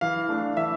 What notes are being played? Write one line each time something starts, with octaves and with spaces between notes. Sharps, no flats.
E3 F5
A3 D4
E3 E5